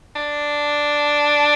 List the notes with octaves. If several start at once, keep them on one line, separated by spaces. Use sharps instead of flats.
D4